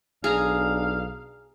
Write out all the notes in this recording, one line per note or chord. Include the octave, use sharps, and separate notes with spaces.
B1 D4 G#4 F5 A#5